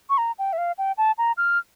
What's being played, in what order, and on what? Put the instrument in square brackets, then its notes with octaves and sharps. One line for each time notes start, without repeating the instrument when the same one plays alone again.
[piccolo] C#6
A#5
G5
E5
F5
G5
A5
A#5
F6